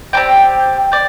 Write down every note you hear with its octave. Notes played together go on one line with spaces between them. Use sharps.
C4 G4 D5 G5
D5 G5